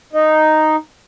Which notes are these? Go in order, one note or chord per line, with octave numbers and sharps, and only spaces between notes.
D#4